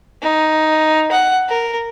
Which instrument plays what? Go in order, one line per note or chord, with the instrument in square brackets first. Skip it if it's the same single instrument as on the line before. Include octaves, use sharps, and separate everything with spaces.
[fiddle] D#4
F#5
A#4